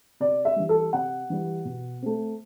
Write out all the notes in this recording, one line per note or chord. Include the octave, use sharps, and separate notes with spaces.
C3 D5
E5
E3 G3
A4
C3 F#5
E3 G3
B2
A3 C4